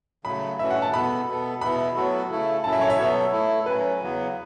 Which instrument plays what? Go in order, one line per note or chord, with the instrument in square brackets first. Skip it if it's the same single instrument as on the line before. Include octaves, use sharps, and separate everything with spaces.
[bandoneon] C#3 F#3 A3 [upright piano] B5
[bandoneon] E3 A3 C#4 F#4 [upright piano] E5
[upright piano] F#5
A5
[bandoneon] E2 B2 B3 A4 [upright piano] B5
[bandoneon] B2 B3 A4
[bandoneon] E2 B2 B3 E4 [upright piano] B5
[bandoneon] A2 F#3 B3 F#4 A4
C#3 A3 E4 A4
[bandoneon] F#2 F#3 C#4 E4 A4 [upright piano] A5
[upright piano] E5
C#5
E5
[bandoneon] B2 F#3 B3 A4 [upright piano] C#5
[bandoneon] A2 A3 E4 A4
[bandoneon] A2 F#3 C#4 [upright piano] B4
[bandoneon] E2 C#3 F#3 B3